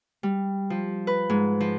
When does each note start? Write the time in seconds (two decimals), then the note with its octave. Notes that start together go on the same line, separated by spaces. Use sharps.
0.23 G3
0.70 F3
1.07 B4
1.30 G#2
1.60 F3